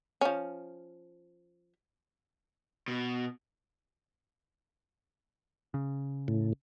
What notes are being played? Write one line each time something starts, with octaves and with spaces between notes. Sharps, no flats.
F3 C#4
B2
C#3
A2